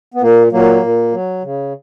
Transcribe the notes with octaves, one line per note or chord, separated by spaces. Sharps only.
B3
A#2 A#3
A#2 F#3 A#3
A#2
F#3
C#3